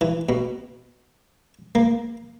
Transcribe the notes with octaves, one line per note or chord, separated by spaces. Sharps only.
E3
B2
A#3